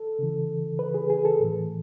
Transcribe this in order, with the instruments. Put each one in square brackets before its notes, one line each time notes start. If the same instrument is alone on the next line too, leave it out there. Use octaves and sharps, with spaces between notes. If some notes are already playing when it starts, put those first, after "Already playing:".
Already playing: [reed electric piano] A4
C#3 E3
B4
G#4
G#4
A4
A2 E3